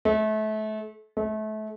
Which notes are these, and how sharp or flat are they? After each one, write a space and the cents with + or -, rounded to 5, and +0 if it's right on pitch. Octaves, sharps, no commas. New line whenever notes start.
A3 -30
A3 -30